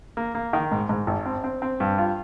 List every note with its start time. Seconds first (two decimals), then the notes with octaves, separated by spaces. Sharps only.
0.17 A#3
0.35 A#3
0.53 D#3
0.72 G#2
0.89 G#2
1.07 G#1
1.26 C4
1.44 C4
1.62 C4
1.80 G2
1.98 F4